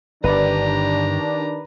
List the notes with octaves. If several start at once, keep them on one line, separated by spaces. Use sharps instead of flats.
G1 D#3 D4 G4 B4 D5 A#5